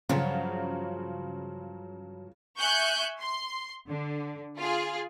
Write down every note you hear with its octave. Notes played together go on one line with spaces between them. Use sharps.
G2 C#3 F3 F#3
E5 G#5 C#6 F#6 G6
C6
D3
F4 G#4